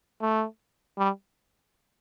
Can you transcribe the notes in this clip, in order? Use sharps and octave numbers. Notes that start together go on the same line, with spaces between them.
A3
G3